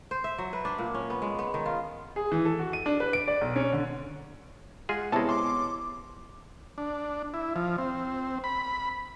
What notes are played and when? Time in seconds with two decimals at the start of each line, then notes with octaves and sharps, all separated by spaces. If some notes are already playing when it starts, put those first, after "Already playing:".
0.11 C5
0.24 E5
0.38 F#3
0.53 B4
0.65 D4
0.78 A#2
0.95 C#4
1.10 B3
1.22 G#3
1.39 B3
1.54 D#3
1.66 F4
2.16 G#4
2.32 E3
2.45 A4
2.59 F#4
2.73 D#7
2.86 D4
3.00 B4
3.13 D7
3.28 D5
3.41 B1
3.56 C#4
3.72 D3
4.89 G#3 F4 G#4 F#5
5.12 C3 G#3 B3 E4 C#5 A5
5.29 C6 D6
6.78 D4
7.34 E4
7.56 F3
7.78 C4
8.44 B5